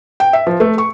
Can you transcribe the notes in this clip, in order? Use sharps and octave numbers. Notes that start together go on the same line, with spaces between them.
G5
E5
F3
A3
C#6